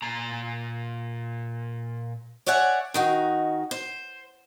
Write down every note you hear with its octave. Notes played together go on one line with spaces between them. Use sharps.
A#2 A#5
C#5 D5 E5 F#5 G#5
D#3 D#4 F#4
C5